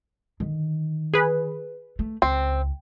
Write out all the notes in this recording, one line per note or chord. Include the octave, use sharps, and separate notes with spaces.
D3 D#3
G#4 B4
A3
C#2 C4